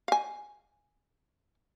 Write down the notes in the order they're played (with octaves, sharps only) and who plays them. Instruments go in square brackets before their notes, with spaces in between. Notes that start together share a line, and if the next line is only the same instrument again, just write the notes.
[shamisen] F5 G#5